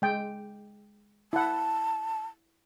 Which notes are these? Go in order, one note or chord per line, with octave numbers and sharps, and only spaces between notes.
G#3 G5
E4 F#5 A5